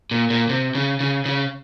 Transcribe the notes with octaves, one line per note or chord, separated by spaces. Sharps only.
A#2
A#2
C3
C#3
C#3
C#3